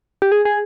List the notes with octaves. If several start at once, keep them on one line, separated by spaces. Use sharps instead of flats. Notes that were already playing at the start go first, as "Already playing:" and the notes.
G4
G#4
G#4